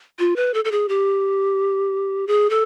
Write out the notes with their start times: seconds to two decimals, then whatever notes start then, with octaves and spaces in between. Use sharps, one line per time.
0.19 F4
0.36 B4
0.54 A4
0.65 A4
0.72 G#4
0.89 G4
2.27 G#4
2.50 A4